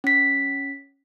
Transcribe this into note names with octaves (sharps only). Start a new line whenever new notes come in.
C#4 B6